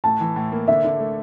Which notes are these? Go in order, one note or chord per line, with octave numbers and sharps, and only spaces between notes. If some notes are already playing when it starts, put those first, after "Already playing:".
A2 A5
E3
A2
A#3
D3 E5
D3
A3